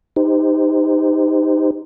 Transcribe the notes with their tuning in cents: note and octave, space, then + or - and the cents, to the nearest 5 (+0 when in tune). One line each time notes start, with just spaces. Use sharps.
D#4 +0 G4 +20 C5 -25